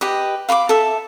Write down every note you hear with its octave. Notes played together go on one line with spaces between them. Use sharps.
G4 B4 D#5
F5 B5 C6 D6
A4 E5